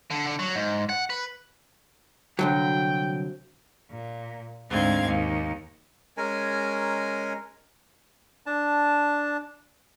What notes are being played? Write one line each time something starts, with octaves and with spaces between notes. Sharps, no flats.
D3
D3
F#3
G#2
F#5
B4
C2 D3 F#3 G5
A#2
D2 G#2 G#3 C4 F5 G#6
D#2
G#3 C#4 A#4 G#5
D4 A5